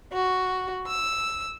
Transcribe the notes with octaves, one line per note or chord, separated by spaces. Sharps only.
F#4
E6